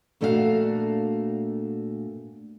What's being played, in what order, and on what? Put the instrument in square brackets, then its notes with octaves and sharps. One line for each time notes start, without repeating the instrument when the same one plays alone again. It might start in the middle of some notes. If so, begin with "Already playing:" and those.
[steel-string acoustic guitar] A#2 A3 D4 F#4 A4 F5